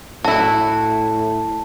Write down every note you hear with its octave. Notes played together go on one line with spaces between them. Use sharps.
A2 E4 F#4 A5